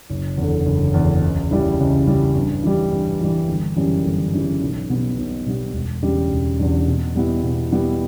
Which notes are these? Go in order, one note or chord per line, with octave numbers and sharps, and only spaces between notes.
F#1
E2 D3
F#1
E2 D3
C#2
C#3 G3 C#4 E4
C#2
C#3 G3 C#4 E4
G2
E3 G3
G2
E3 G3
G1
F#2 C#3 E3 G3
G1
F#2 C#3 E3 G3
B1
B2 G3 B3
B1
B2 G3 B3
E1
E2 C#3 G3 D4
E1
E2 C#3 G3 D4
B2
G3 B3 E4
B2
G3 B3 E4